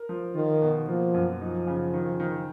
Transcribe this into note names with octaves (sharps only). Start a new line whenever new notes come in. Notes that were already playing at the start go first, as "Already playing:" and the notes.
Already playing: A#4
F3
D#3 F4
B2
F3 A#3
F#2
F3 D#4
C#3
D#3
D#3